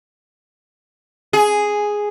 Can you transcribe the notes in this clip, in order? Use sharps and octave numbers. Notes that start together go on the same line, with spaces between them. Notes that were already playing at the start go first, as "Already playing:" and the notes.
G#4